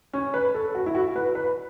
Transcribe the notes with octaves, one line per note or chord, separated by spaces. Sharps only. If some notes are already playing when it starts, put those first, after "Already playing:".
C#4
B4
A4
F#4
E4
F#4
B4
B4